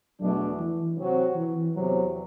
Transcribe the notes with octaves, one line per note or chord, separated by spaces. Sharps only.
E2 B2 F#3 A3 D4
E3
C3 F#3 C4 F#4
E3
E2 C3 F#3